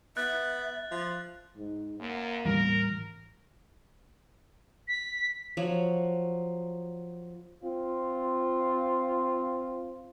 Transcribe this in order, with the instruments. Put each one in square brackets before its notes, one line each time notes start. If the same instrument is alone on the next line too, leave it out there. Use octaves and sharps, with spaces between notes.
[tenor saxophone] B3 [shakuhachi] E5 [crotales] F#6 A6
[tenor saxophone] F3
[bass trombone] G#2
[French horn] F#2 [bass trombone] A#3
[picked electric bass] A2 E3 G3 [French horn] A#4
[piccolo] B6
[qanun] F3 F#3 C#5
[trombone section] C4 F4